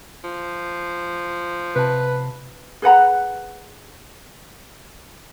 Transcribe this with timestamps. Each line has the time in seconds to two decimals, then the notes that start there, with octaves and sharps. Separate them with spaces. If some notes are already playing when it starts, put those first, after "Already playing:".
0.24 F3
1.76 C3 B4 A5
2.82 G#4 B4 F#5 A#5